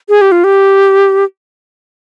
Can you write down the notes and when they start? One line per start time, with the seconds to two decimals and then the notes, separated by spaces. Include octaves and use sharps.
0.09 G#4
0.21 G4
0.32 F4
0.44 G4